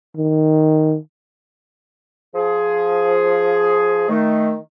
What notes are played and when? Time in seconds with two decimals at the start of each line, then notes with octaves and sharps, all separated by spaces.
0.17 D#3
2.35 F3 G#4
4.09 D#3 A3